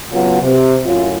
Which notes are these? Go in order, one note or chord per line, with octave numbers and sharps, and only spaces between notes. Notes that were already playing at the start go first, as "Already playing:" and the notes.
C#3 F#3 B3 F4
C3
F#2 A2 F4